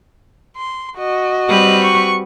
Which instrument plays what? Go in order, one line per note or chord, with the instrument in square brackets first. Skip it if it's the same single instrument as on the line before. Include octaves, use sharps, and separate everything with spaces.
[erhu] C6
[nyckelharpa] F#4 [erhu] D#5
[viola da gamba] G3 C4 B4
[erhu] C#6